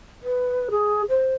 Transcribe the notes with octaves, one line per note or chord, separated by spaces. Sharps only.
B4
G#4
C5